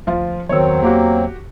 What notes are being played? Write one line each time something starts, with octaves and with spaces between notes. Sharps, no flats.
D2 F3 B3 F4
E2 D#3 F#3 C4 C#5 E6
A#3 F#4 G4